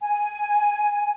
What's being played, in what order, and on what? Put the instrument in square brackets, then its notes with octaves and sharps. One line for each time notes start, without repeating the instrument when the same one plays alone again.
[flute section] G#5